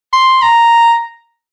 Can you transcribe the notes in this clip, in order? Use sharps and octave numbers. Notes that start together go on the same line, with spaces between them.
C6
A#5